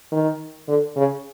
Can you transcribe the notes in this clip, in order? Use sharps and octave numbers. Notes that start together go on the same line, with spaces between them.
D#3
D3
C#3